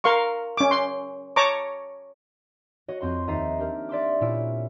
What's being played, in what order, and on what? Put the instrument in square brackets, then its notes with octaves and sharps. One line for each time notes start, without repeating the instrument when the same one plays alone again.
[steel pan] A#4 F5 C6 C#6
C#4 D6
C6
C#5 A5 A#5 C#6 D6
[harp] F#4 C#5 D#5
F2 C4 D#5 C6
D#2 D#5 E5 A#5 A6 C7
D4 G4 A#4
D5 E5 C6 D6
A#2 C#4 E4 E6 D7